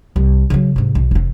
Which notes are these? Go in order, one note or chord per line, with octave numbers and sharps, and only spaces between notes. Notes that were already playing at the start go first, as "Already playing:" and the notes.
C2
C#3 F#3
G#2 C3
B1
F1 C4